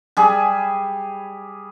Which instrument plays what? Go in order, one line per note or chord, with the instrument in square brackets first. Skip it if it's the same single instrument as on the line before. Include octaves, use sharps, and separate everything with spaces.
[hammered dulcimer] G3 G#4